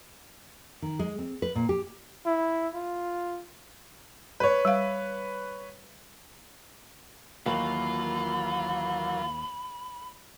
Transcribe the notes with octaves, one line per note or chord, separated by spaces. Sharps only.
D#3
G#3
C4
B4
A#2
G4
E4
F4
B4 C#5
G3 F5
D#2 E3 F#3 A#3 F4 B5